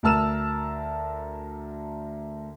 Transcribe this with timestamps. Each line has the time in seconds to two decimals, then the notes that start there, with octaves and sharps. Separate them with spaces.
0.03 D2 A#4 A5 E6 F6 E7